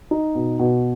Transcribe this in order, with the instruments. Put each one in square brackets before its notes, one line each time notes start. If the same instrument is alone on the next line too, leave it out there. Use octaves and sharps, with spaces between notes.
[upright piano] D#4
B2
B2